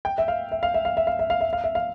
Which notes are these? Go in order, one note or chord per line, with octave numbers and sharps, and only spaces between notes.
G5
E5
F5
E5
F5
E5
F5
E5
F5
E5
F5
E5
F5
E5
F5